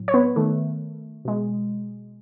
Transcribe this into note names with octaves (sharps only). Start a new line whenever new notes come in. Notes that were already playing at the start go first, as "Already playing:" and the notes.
Already playing: A2 F#3
C#5
B3 B4
D#3 A3
B2 G#3